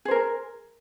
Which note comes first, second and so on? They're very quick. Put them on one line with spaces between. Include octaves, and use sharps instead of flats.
G#4 C5 A#4